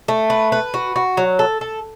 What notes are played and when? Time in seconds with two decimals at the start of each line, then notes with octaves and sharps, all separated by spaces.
0.08 A3
0.30 B4
0.52 B4
0.74 F#4
0.96 F#4
1.17 F#3
1.39 A4
1.61 A4